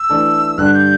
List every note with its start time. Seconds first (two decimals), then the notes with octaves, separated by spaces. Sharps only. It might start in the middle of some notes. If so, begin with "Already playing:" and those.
Already playing: E6
0.10 E3 A3 D4 A4
0.58 G2 D3 G3 D4 G4 F#6
0.74 G6